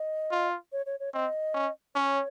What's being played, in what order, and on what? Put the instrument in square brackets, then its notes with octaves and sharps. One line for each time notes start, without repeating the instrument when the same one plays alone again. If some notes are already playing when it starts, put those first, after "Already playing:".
Already playing: [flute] D#5
[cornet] F4
[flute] C#5
C#5
C#5
[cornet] C4 [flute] D#5
[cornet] C#4
[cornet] C#4 [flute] C#5